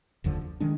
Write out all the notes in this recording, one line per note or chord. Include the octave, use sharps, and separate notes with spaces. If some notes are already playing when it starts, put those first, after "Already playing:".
F1 D#2 D3 F3
D#3 G#3 D4